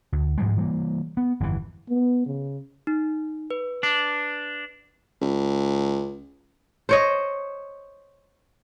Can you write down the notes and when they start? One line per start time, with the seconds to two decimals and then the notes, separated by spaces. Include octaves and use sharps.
0.12 D2
0.38 G#2 F3 G3 G#3
0.57 E3 G3 G#3 A#3
1.17 B3
1.40 G1 F2 C3 E3
1.90 B3
2.26 C#3
2.87 D#4
3.50 B4
3.83 D4
5.21 C#2
6.89 C5 C#5 D#5